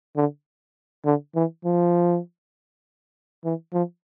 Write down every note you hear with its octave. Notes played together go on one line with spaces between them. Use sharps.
D3
D3
E3
F3
E3
F3